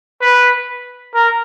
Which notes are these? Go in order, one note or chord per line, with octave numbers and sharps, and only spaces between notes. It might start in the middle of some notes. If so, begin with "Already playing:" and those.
B4
A#4